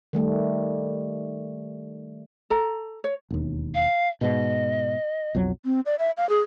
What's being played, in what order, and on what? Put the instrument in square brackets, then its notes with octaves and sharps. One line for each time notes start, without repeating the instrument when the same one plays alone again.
[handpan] D#3 G3 A3
[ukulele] A4 A#5
C#5
[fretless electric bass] E1 D#2
[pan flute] F5
[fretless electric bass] G#2 B2 [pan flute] D#5
[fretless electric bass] B1 F2 F#3
[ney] C4
D5
E5
F5
G#4